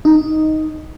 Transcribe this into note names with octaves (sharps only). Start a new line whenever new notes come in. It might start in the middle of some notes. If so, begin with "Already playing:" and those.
D#4